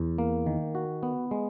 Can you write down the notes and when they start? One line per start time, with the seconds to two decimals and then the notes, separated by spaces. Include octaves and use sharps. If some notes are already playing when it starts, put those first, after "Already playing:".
Already playing: E2
0.18 A#3
0.46 D#3
0.75 F#4
1.03 B3
1.31 G#3